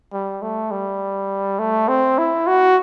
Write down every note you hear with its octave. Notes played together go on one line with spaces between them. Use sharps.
G3
A3
G3
A3
C4
E4
F#4